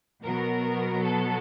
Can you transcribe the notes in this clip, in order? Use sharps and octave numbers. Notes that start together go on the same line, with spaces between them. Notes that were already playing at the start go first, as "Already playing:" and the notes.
B2 F#3 B3 A#4
A4